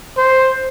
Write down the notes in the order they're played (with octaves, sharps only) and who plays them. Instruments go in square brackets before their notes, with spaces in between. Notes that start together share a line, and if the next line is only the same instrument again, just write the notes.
[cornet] C5